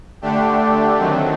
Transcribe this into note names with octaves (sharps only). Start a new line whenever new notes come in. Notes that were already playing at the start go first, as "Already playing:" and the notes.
D3 A3 D4 G4
D#3 F#3 A3 C4